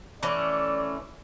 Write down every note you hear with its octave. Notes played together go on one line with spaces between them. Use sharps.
E3 A3 C#4 D5